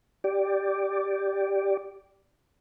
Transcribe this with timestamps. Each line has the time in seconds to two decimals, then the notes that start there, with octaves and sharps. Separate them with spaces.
0.24 G4 D5